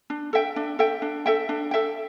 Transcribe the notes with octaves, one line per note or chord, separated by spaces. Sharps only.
D4
A4 E5 G5
D4
A4 E5 G5
D4
A4 E5 G5
D4
A4 E5 G5